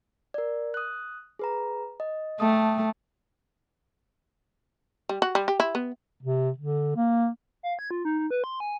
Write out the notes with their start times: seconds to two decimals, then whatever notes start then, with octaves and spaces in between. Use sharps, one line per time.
0.34 A#4 D5
0.74 D#6 F#6
1.39 G#4 B4 A#5
2.00 D#5
2.40 A3 G5 A5 D#6
5.09 G3
5.22 F#4
5.35 G3
5.48 G4
5.60 E4
5.75 B3
6.23 C3
6.58 D3
6.96 A#3
7.63 F5
7.79 G#6
7.91 F4
8.05 D#4
8.18 D#4
8.31 B4
8.44 C6
8.60 G#5